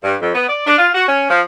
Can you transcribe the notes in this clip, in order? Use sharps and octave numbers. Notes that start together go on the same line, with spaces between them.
G2
F2
B3
D5
D4
F4
F#4
C#4
F3